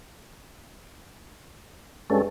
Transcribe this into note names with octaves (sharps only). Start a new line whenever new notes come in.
G2 G#3 C#4 A4